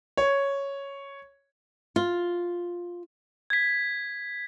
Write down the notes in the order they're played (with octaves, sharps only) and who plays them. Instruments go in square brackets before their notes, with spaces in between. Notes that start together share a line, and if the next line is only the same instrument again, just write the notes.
[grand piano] C#5
[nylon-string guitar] F4
[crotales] G#6 B6